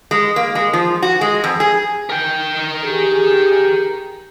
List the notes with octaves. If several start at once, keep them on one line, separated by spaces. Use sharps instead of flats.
G#3
A#3
G#3
F3
F#4
G#3
F2
G#4
A#4 G5
G4 G#4